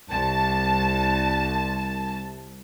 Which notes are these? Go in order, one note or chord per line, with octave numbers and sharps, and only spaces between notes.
C2 A5